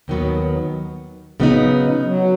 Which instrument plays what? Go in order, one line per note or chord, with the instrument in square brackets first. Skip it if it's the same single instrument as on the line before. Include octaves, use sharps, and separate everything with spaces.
[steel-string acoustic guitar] D#2 D#3 F#3 B3
C#3 F#3 B3 D#4
[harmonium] F#3